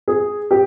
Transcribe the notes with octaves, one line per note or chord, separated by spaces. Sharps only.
G#4
G4